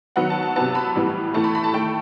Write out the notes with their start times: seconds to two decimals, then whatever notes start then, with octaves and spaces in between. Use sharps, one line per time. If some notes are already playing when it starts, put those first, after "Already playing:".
0.16 D#3 F#3 B3 F#5
0.30 A5
0.43 A5
0.56 C3 F#3 B3 A5
0.75 B5
0.95 A2 E3 G3 B3
1.34 A2 E3 A3 A5
1.44 B5
1.55 B5
1.64 A5
1.74 D#3 A3 G5